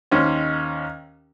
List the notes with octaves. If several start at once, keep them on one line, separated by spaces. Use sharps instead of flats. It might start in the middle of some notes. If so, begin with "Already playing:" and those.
D#2 D#3 C#4 C5